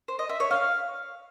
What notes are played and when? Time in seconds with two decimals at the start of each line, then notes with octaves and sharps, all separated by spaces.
0.08 C5
0.19 D#5
0.29 E5
0.40 C#5
0.51 F5